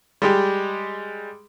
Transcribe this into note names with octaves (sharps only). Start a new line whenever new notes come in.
G3 G#3 G4